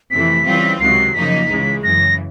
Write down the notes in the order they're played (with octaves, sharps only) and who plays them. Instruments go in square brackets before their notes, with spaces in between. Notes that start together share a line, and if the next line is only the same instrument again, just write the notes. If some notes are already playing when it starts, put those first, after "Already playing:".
[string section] F2 C3 E3 A3 [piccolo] B6
[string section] C#3 E3 G3 C4 F4
[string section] C#2 C3 D#3 F#3 [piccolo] C7
[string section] F#2 C#3 F3 A#3 D#4 [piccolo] B6
[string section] C#2 C#3 E3 G#3
[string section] F#2 C#3 E3 [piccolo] A#6